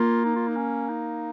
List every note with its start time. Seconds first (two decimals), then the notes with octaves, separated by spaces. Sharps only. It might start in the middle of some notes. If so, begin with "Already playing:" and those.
Already playing: A#3 F4
0.25 D#4
0.36 F4
0.47 D#4
0.57 C#4
0.90 D#4